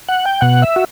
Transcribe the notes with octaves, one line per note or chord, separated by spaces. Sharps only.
F#5
G5
B2 F#5
E5
F#4